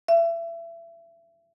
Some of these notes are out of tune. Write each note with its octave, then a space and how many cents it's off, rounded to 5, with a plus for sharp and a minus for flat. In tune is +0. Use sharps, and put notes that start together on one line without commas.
E5 +30